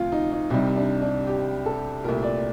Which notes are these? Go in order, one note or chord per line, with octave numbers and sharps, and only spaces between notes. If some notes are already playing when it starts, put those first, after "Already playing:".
Already playing: D2 C3 F3 F4
D#4
D#4
C2 C3 G3 D#4
D4
D4
G4
A4
C2 A#2 A3 A#4
D5